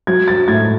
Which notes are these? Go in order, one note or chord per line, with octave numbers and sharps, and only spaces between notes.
F#3 G#6
A6
A2 G#6